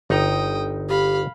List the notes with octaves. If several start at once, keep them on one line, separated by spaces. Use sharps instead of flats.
G1 D#4 G5 A#5 D#6
G4 F5 B5